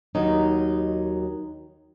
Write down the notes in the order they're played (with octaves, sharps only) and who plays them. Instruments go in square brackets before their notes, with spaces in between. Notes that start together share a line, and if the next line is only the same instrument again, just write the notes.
[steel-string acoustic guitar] D#2 D#3 F#3 D#4